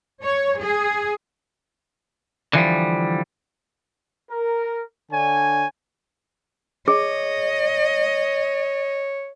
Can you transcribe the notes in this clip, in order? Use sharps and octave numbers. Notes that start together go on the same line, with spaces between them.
C#5
G#4
D3 E3 F3 G3
A#4
D3 D4 C#5 G#5
G#4 C#5 D#5